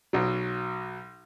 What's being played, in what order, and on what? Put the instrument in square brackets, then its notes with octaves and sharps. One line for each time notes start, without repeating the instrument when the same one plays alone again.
[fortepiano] B1 F#3